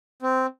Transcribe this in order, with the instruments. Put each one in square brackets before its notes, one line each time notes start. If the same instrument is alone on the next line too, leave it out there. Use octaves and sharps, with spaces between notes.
[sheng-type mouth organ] C4